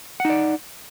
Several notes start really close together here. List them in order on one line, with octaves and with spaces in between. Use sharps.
F#5 D#4 D5